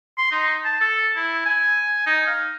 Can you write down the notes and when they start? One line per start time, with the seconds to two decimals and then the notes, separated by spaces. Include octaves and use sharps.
0.18 C6
0.31 D#4
0.64 A5
0.81 A4
1.16 E4
1.45 G#5
2.06 D#4
2.27 F5